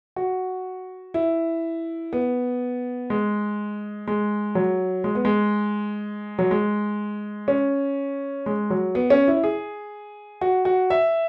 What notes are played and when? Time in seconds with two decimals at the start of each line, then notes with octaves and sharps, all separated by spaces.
0.16 F#4
1.14 E4
2.13 B3
3.10 G#3
4.07 G#3
4.55 F#3
5.04 G#3
5.15 B3
5.25 G#3
6.39 F#3
6.51 G#3
7.48 C#4
8.46 G#3
8.70 F#3
8.95 B3
9.10 C#4
9.28 E4
9.44 G#4
10.41 F#4
10.65 F#4
10.90 E5